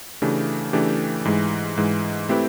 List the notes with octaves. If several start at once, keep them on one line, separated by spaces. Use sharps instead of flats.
C#3 E3 A3 D4 G4
C#3 E3 A3 D4 G4
G#2 E3 G#3
G#2 E3 G#3
A3 C4 E4 G4 B4